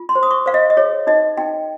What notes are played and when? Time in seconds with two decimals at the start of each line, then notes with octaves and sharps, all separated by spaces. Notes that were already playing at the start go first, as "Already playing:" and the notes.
Already playing: F4
0.09 C6
0.15 C5
0.23 D#6
0.31 C#6
0.46 C5 F5
0.54 D#5
0.70 D#5
0.77 G#4 C#5
1.07 D#4 D#5
1.37 D#4 G5